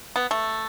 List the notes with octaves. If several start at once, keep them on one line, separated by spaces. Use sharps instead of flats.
B3
A3